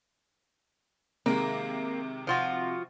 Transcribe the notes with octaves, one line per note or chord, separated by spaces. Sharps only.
C3 D#3 G#3 A#3
F3 F4 F#4